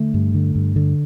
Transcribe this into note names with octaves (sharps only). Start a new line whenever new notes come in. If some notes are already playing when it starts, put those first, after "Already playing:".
Already playing: D3 A3
G2
D3
G2
D3